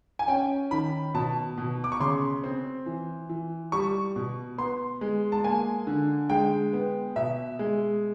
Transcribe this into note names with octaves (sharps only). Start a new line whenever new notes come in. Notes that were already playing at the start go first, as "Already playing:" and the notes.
G#5
C#4 G5
D#3 B5
B2 A5
B2
D6
C#6
C#3 C6
C4
E3
E3
G3 C#6
B2
B3 C6
G#3
A5
A#3 G#5
D3
G#3 G5
B3
B2 E5
G#3